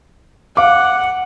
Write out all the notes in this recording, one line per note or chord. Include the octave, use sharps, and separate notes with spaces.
F5 F#5 D6